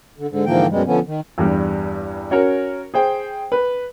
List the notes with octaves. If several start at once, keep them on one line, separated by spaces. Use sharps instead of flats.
D3
G#2 D3
G#2 D3 E3 F3 A#3 G5
F#2 B2 G3 G#3
D3 F3 B3 C#4
D#3
E2 G2 G3
C#4 F#4 A#4 C#5
G#4 C5 G5
B4